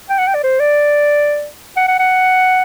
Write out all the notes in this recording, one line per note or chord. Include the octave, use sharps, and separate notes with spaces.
G5
F#5
G5
D5
C5
D5
F#5
F#5
F#5